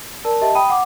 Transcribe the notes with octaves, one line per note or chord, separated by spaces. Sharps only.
A#4 D5 A5
G4 D#5 E5 A5
G5 B5 D#6 D#7
F#5 D6